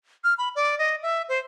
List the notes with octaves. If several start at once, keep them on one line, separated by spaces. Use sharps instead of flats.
F6
B5
D5
D#5
E5
C5